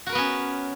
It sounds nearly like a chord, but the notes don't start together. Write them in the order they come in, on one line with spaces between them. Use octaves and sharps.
F#4 A#4 B4 B3 C#4